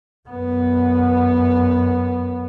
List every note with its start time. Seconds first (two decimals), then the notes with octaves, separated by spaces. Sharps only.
0.29 F#2 B3